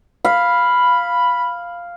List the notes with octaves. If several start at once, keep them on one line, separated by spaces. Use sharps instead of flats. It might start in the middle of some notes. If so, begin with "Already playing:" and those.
F5 B5